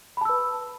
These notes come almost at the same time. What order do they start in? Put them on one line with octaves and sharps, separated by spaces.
B5 A5 E6 B4